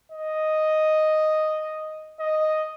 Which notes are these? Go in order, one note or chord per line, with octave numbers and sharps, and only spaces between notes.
D#5
D#5